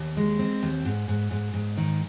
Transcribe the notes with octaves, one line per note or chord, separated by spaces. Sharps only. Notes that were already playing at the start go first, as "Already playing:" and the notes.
Already playing: D#2
G#3
C4
D#2
G#2
G#2
G#2
G#2
D#3